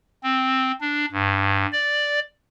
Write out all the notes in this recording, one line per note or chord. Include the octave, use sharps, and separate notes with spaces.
C4
D4
G2
D5